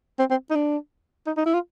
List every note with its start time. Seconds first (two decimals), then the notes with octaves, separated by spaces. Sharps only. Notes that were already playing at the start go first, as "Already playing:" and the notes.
0.19 C4
0.31 C4
0.50 D#4
0.55 D4
1.27 D#4
1.37 D#4
1.45 E4
1.54 F4